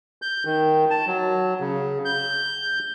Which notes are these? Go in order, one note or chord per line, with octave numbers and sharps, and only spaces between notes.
G6
D#3
A5
F#3
C#3
G6